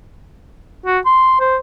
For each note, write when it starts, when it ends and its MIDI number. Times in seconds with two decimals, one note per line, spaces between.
0.86 0.99 66
1.05 1.38 84
1.40 1.57 72